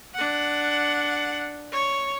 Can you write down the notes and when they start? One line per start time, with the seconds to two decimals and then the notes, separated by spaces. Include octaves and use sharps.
0.14 D4 F#5
1.72 C#5